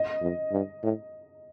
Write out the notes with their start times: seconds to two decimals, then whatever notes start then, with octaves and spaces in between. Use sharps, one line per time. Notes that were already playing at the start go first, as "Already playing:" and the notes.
Already playing: D#5
0.22 F2
0.52 G2
0.83 A2